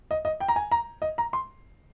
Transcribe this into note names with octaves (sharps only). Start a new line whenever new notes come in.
D#5
D#5
G5
A#5
G#5
A#5
D#5
A#5
C6